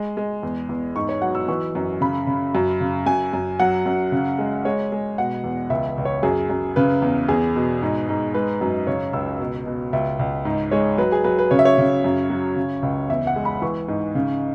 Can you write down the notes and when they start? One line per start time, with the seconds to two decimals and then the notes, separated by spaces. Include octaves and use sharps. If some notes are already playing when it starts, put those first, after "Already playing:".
Already playing: G#3
0.17 G#3
0.43 E2
0.69 E2
0.96 G#2 C#6
1.09 C#5
1.22 F#3 F#5
1.35 E6
1.48 E3 C#6
1.75 F#2
2.01 C#3 B5
2.27 C#3
2.55 F#2
2.81 C#3
3.06 F#2 G#5
3.33 F#2
3.60 F#3 F#5
3.86 F#2
4.12 C#3
4.39 G#3
4.65 G#3 C#5
4.92 G#3
5.18 B2 F#5
5.44 E2
5.70 C#2 E5
5.98 C#2
6.05 C#5
6.23 F#2 G#4
6.50 F#2
6.76 C#3 B4
7.02 E2
7.29 E2 G#4
7.56 B2
7.82 G#2
8.09 G#2
8.34 G#3 B4
8.61 F#2
8.87 C#3 C#5
9.13 C#2 E6
9.40 B2
9.66 B2
9.93 C#2 E5
10.19 C#2
10.45 G#2
10.71 G#3 C#5
10.98 F#3 B4
11.12 G#4
11.24 F#3 B4
11.39 B4
11.51 C#3 C#5
11.59 E5
11.65 C#5
11.78 C#3
12.04 F#2
12.30 F#3
12.56 C#3
12.83 C#2
13.09 E2 E5
13.27 F#5
13.36 G#3
13.45 B5
13.62 E3 C#6
13.88 G#2
14.15 C#3